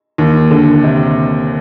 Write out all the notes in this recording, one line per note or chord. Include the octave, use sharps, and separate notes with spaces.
D#2
D3
C3